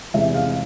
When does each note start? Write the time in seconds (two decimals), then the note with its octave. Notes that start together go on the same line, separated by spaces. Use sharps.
0.14 E2 C3 G#3 E5
0.34 F5